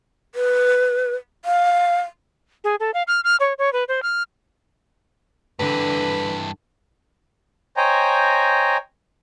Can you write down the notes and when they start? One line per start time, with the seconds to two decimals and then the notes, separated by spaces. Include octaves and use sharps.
0.35 B4
1.45 F5
2.64 G#4
2.80 A4
2.94 F5
3.07 F6
3.24 F6
3.40 C#5
3.58 C#5
3.73 B4
3.88 C5
4.03 F6
5.59 G2 D3 E3 B4
7.77 C5 C#5 D#5 G5 G#5 A#5